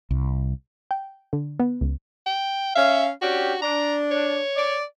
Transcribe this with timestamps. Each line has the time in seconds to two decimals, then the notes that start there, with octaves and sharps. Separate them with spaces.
0.11 C2
0.91 G5
1.33 D3
1.60 B3
1.81 C#2
2.26 G5
2.75 C#4 E5 F5
3.22 C#4 D4 F#4 G4
3.62 D4 A#5
4.11 C#5
4.56 D5